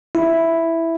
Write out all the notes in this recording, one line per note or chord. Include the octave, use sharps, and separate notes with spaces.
E4